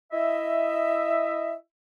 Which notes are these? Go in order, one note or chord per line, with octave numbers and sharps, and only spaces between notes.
E4 D#5 E5